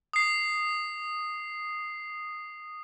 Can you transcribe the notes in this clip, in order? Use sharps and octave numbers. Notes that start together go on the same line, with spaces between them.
D#6 C7